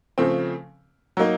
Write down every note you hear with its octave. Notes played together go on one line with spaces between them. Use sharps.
C#3 F3 A3 C4
F#3 A#3 D#4